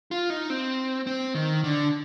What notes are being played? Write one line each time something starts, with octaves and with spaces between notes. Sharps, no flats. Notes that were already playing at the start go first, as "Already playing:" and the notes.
F4
D#4
C4
C4
D#3
D3